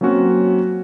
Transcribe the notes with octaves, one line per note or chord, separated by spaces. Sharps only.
F#3 A#3 C4 C#4 F#4